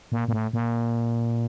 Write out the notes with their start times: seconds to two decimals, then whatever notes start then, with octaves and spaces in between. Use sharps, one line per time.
0.12 A#2
0.28 A#2
0.33 A2
0.53 A#2